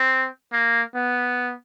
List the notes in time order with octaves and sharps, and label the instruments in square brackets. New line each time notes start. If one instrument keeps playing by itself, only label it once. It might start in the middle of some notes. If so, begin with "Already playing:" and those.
Already playing: [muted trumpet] C4
A#3
B3